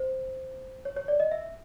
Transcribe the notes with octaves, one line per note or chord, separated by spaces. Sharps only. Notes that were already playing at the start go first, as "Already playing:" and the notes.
Already playing: C5
C#5
C#5
D5
D#5
E5